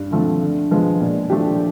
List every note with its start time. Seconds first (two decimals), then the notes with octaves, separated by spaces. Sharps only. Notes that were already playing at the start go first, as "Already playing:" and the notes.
Already playing: G2
0.11 D3 F3 A3 C4
0.41 D3
0.71 F3 G#3 B3
1.01 A#2
1.30 F3 A3 D4 G4